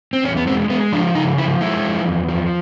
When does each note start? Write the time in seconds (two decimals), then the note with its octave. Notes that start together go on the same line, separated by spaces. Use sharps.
0.13 C4
0.23 E2 C#4
0.37 B3
0.47 G#3 C4
0.70 G#3 B3
0.92 F3 D4
1.15 C#3 D#4
1.38 F3 E4
1.61 G#3 E4
1.84 F3
2.06 E2
2.29 F3